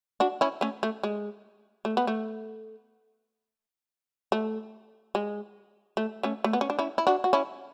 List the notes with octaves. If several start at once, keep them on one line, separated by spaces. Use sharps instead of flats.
D4 F#4
C#4 E4
A3 C#4
A3
G#3
A3
B3
A3
A3
G#3
A3
A3 C#4
A3
B3
C#4
D4
C#4 E4
E4
D4 F#4
F#4
C#4 E4